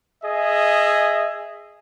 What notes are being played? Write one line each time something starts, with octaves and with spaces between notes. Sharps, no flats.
G#4 D#5 E5